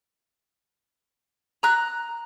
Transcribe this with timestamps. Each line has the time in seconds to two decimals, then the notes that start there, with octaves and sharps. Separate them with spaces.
1.63 A#5 F#6